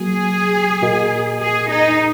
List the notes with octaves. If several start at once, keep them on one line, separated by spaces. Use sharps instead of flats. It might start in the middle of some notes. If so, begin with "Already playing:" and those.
Already playing: F#3 A#3 F#4 G#4
A#2 A#3 F#4 A#4 D#5
G#4
D#4